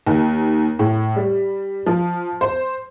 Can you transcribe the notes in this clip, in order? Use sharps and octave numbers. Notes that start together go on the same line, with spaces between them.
D#2
A2
G3
F3
C5